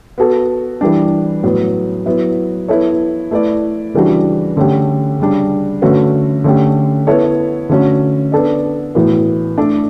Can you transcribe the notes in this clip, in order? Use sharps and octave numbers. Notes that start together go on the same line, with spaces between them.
B3 F#4 A4
E3 G3 D4
A2 F#3 B3
F#3 B3 E4
B3 E4 A4 C#5
A3 E4 B4 D5
C#3 E3 G3 D4 F#4
D3 A3 C#4 G4
C#3 G3 D4
D3 A3 C#4 F#4 B4
D3 A3 C#4 G4
B3 E4 A4 C#5
D3 A3 C#4 F#4
B3 D4 A4 D5
A2 E3 B3 F#4
A3 D4 A4 D5